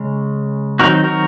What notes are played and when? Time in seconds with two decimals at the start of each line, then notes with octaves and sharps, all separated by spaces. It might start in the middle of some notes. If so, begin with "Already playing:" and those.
Already playing: C#3 G#3 C#4
0.79 D#3 F#3 C4 D#4 F#4 A#4
1.04 F#4 A#4